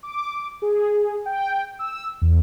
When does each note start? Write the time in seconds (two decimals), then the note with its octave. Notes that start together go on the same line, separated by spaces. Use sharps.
0.03 D6
0.62 G#4
1.26 G5
1.79 E6
2.22 E2